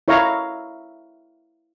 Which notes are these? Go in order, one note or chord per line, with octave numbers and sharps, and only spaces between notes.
E4 C#5 E5 F5 A#5